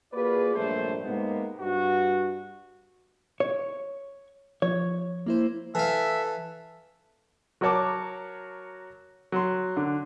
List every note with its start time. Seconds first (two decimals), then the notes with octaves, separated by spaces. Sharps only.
0.13 A#3 F4 F#4 G#4 B4 D5
0.55 A#1 G2 F#3 G3 A3 C5
1.03 G#2 C3 G#3 A#3 B3
1.60 G2 F#4
3.40 C#5
4.62 F3 C#5
5.26 A#3 E4 C5
5.75 E3 A4 E5 F5
7.61 F#3 F#4 A#4 C#5 A5 D6
9.32 F#3 C6
9.77 D3